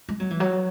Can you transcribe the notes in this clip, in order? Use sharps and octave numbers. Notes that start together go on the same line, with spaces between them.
G#3
F#3
E3
F#3